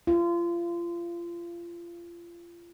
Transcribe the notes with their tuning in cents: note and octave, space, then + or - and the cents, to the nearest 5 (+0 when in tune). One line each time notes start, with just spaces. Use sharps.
F4 -30